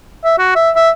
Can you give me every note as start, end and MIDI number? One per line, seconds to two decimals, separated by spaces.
0.24 0.33 76
0.39 0.55 66
0.55 0.70 76
0.76 0.90 76